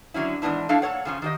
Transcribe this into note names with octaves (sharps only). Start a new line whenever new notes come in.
D3 F#3 C#4 E4
E2 G#2 D3 B3 D4 E4
A3 D4 E4 A4 F5
A#2 A4 C#5 F#5
C#3 F3 C#4
D#3 G4 D#5